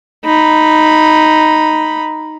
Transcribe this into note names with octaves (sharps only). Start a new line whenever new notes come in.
D#4 B5